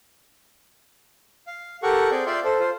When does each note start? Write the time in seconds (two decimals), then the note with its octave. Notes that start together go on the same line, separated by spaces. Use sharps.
1.47 F5
1.83 G4 A4 A#4 F#5 C#6
2.11 C4 G#4 D5 G5
2.26 F4 D5 E5 G5 C6
2.44 A4 C5
2.60 F4 C5